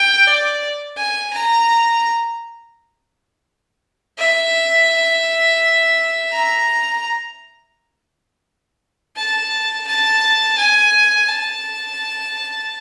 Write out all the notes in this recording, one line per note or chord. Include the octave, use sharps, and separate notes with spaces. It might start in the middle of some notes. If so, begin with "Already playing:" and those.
Already playing: G5
D5
G#5
A#5
E5
A#5
A5
A5
G#5
A5